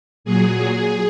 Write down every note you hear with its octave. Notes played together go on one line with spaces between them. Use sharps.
A#2 F#3 G#4